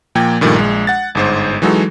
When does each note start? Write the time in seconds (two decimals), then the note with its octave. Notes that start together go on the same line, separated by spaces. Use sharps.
0.15 A#2 F3 A#3 G5 G#6
0.41 G2 A#2 D#3 F3 G3 A3
0.56 A#1 G#3
0.87 F#5 A6
1.15 G1 G#2 C5
1.62 E3 F#3 G#3 D#4 F#4 A4